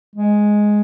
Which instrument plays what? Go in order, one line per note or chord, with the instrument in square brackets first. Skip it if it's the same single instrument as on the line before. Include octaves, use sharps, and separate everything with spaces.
[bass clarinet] G#3